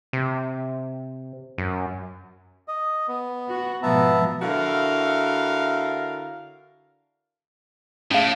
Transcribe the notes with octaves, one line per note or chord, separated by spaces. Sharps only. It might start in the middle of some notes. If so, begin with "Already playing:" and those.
C3
F#2
D#5
B3
F#4
G#2 B2 F3 B3 E5 A5 A#5
D3 E4 F#4 A#4 F5
A2 C#4 F5